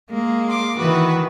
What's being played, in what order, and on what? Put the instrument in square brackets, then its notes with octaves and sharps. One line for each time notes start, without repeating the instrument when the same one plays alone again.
[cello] G#3 A#3
[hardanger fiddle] C6 D6
[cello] D#3 E3 [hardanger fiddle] F#4 B4